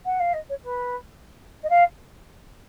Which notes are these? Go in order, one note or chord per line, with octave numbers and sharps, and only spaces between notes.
F#5
F5
D#5
C#5
B4
D#5
F5